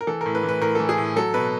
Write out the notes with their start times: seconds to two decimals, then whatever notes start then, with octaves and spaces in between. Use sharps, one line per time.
0.01 A#4
0.07 E3 A4
0.21 A2 A#4
0.35 B4
0.43 E3
0.49 B4
0.61 A2 A#4
0.75 E3 A4
0.89 G#4
0.98 A2
1.16 F#3 A4
1.34 B2 B4